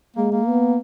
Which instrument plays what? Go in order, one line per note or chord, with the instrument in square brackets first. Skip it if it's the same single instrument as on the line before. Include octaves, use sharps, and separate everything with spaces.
[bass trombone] G#3 [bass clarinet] A#3
[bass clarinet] A#3
[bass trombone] B3